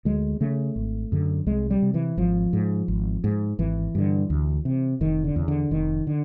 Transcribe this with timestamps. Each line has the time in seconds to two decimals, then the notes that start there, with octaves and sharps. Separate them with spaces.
0.05 D2 G#3
0.41 C#3 A3
0.76 G#1
1.12 F#2 D3
1.46 C2 G#3
1.71 G3
1.82 C3
1.94 E3
2.17 G#1 F3
2.53 G#2
2.88 G#1
3.24 G#2
3.59 G#1 E3
3.95 G2 D3
4.30 D2
4.65 C3
5.01 F1 D#3
5.24 D3
5.36 E2 C#3
5.48 D3
5.71 F1 D#3
6.07 D3